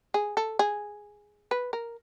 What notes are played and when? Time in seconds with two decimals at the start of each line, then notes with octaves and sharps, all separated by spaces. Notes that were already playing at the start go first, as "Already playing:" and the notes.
0.14 G#4
0.37 A4
0.59 G#4
1.51 B4
1.73 A#4